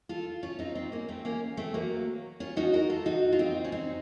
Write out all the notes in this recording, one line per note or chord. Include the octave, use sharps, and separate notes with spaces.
F4 A4
C#4 F4
C4 D#4
C4 D#4
A#3 C#4
A3 C4
A#3 C#4
A3 C4
F#3 A#3
C#4 F4
D#4 F#4
F#4 A#4
F4 A4
D#4 F#4
F4
C4 D#4
C#4
C4 D#4